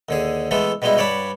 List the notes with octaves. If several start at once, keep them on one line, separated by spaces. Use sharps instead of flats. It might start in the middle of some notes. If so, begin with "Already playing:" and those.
D#2 D3 G#4
E3 G#3 A3 B3 A4
B2 G3 G#3 D#4 E4
G2 C#5 D5 F#5 A5 B5